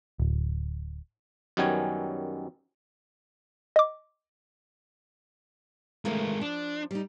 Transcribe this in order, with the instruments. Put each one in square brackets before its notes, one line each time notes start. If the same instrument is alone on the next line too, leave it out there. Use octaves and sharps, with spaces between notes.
[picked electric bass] D1
[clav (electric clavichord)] F#2 D#3 G3 B3 C#4 G#5
[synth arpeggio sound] D#5 D6
[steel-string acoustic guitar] C#3 E3 A3 [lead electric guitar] G#3 A#4
[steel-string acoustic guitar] F3 [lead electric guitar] D4
[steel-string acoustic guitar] G3 D#4